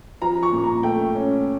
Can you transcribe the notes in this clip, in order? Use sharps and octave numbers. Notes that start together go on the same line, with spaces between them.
F3 A#5
C#6
A#2
A#5
A3 G5
C#4